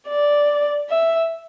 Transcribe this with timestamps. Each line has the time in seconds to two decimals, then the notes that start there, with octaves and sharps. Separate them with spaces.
0.08 D5
0.90 E5